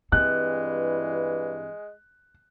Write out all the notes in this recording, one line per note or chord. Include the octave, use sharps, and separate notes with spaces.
G2 E3 G#3 C4 F#6